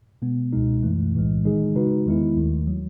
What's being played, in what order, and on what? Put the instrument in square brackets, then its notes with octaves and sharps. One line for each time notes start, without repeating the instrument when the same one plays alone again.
[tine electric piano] B2 G#3 B3
C#2 B2 G#3 D#4
F#2 E3 A3
B1 A2 E3 G#3
D#3 G#3 D#4 G#4
C#3 G#3 D#4 F#4 B4
E2 D#3 G#3 B3 E4
D#2 D#3 A3
F#3